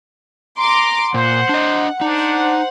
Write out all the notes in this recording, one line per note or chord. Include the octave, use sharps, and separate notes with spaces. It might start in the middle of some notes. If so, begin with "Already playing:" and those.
A#5 C6 D6
A#2 C5 F#5
D4 D#5
D4 D#4 C5 F#5